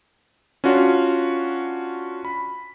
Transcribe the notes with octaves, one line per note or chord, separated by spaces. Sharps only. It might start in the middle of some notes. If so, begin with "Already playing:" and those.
C#4 D4 F4 F#4
B5